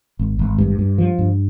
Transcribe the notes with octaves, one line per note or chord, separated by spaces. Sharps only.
G#1
G#1
G2
G2
F3
G2